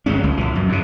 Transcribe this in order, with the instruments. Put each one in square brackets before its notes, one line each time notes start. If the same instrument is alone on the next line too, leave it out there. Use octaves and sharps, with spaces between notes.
[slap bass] G1 G2 G#3 C#4
C#2
A#1 E3
F#2
G2 C#3